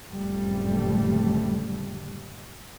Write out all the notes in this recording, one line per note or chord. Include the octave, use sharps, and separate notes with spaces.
F#1 F2 A2 D3 G3 A3